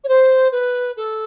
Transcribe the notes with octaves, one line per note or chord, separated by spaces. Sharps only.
C#5
C5
B4
A4